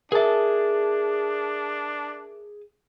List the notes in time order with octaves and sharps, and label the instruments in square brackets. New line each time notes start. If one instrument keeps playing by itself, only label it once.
[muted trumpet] D4 [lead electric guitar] G#4 A5 [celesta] A#4 E5